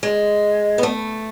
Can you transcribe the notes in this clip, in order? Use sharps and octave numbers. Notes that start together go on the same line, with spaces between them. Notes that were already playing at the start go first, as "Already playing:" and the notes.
G#3
B3
A3